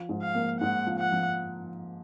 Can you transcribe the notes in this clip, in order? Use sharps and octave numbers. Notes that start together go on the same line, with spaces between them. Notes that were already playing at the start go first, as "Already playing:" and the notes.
Already playing: F3
G#2
F5
A#3
G#2 F#5
F3
F#5
F3